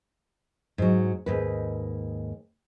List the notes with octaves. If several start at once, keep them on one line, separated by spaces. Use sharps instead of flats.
G#2 F#3
D#2 G#2 B4